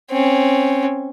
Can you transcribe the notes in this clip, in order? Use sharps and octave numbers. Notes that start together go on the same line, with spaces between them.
C4 C#4